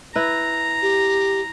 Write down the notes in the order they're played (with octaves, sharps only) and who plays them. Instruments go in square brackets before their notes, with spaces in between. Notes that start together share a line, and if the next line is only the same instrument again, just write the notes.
[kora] E4 B4 [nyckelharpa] A#5
[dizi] G4